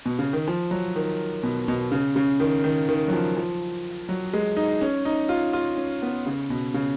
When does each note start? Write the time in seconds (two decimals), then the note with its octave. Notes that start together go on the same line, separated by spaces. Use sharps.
0.06 B2
0.19 C#3
0.33 D#3
0.48 F3
0.71 F#3
0.96 D#3
1.43 B2
1.68 B2
1.92 C#3
2.16 C#3
2.40 D#3
2.64 D#3
2.89 D#3
3.08 F#3
3.12 F3
3.37 F3
4.09 F#3
4.33 G#3
4.57 D#4
4.81 C#4
5.05 D#4
5.29 F4
5.53 F4
5.77 C#4
6.02 B3
6.26 C#3
6.50 B2
6.74 C#3